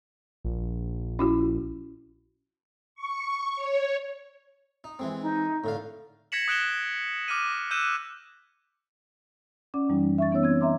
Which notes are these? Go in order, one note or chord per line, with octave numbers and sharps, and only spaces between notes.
A#1
C#4 E4 F#4
C#6
C#5
D#4
E3 G#3 C4
D#4
A2 D3 F5
G#6 A#6 B6 C#7 E7 F#7
D#6 F#6 D7 E7 G7
D6 F6 A#6 D#7
E6 F#6 G6 D#7 E7
C#4 D5 F#5 D6
F#2 E3 G3 D#4
E5 C#6 A6
E3 B3 C#4 D#4 C#5 E6
C4 G#6
D#5 E5 A#5 C6 D6